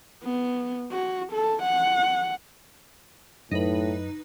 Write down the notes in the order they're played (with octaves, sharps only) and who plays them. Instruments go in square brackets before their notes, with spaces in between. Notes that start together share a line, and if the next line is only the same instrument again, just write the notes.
[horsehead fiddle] B3
F#4
A4
F#5
[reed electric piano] F#2 [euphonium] A2 [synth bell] D#4 B4